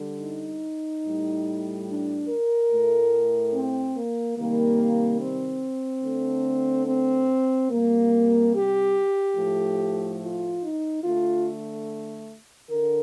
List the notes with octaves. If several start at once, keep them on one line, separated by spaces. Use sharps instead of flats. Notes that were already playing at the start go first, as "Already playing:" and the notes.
Already playing: D3 G3
D#4
A2 G3
D4
A#4
A2 A3
C4
A#3
C3 D#3 G3 A#3
C4
D3 A3
C4
C3 G3 A#3
G4
A2 F3 A3
F4
D#4
D3 A3 F4
D3 A#4